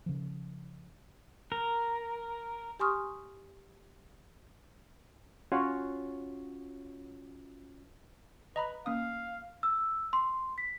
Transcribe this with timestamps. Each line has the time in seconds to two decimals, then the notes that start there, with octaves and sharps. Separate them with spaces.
0.06 C#3 F3
1.52 A#4
2.80 G4 G#5 C6 C#6 D#6 F6
5.52 C#4 F4 F#4 C#5
8.56 B4 D#5 A#5 B5
8.86 A#3 C#4 F5 D#6
9.63 E6
10.13 C6
10.58 B6